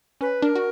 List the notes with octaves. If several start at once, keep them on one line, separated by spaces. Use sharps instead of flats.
C#4 B4
D4 A#4
F#4